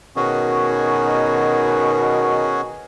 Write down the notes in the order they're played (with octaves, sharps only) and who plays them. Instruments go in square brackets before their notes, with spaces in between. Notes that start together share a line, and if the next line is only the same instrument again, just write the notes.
[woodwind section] B2 D#3 [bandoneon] C#4 F#4 G#4